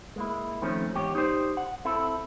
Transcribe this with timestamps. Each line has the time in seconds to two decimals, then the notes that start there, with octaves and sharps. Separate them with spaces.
0.16 G#3 A#3 E4
0.62 D#3 F3 A3 C4 C#4
0.95 E2 G#2 G4 C#5
1.15 D#4 G4 A4 C5 D5
1.57 F#5
1.85 C4 E4 A4